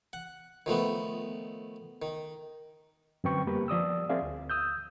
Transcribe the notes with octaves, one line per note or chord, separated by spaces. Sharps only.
F#5
D#3 F3 A3 B3
D#3
F#2 D3 C4 B4 G5 C#6
G3 A#3 B3 G4 A#4 B4
F3 D5 D#6 E6
C4 G#4 A#4 D5 E5 F5
D2
D#6 E6 G6